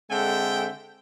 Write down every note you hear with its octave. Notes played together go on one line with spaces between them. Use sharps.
D3 G#3 C4 A4 E5 G5